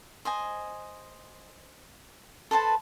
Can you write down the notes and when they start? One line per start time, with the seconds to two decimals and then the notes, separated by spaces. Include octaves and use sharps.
0.25 C5 D#5 G#5
2.51 A4 B4 C5 A5